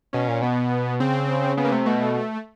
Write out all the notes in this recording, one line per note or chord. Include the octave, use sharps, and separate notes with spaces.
B2 C#4
A#2
B2 B3
C#3 C4
C#3 B3
A#3
C3 A3
B2 A3